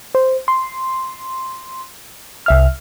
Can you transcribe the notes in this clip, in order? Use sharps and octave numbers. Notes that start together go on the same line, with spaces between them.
C5
C6
C2 E5 F6